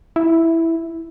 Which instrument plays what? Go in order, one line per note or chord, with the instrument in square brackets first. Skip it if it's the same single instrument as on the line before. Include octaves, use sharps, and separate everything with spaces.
[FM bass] E4